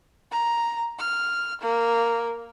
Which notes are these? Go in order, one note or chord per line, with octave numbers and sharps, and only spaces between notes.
A#5
F6
A#3